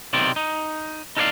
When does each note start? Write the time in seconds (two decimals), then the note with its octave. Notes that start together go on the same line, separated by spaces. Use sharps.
0.13 B1 C3 D#3 C4 D5
0.36 D#4
1.17 D#4 A4 A#4 C#5 D5 F5